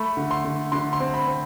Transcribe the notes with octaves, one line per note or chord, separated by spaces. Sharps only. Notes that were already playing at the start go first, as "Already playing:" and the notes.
Already playing: A3 B5
D3
C6
D3
D3 C6
C6
C4
B5
C4